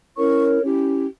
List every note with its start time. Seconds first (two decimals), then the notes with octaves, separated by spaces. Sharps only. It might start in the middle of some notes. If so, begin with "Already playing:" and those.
0.16 C#4 E4 A#4 C#5 C#6
0.63 C#4 E4 G4